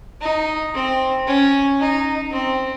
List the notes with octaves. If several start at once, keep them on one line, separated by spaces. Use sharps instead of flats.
D#4
C4
C#4
D#4
C4